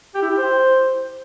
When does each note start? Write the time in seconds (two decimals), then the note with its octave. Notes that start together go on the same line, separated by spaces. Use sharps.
0.15 G4
0.22 E4
0.30 G4
0.38 C5